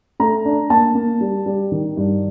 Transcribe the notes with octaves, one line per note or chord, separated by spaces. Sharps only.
A3 A#5
D4
A#3 A5
A#3
G3
G3
D#3
G2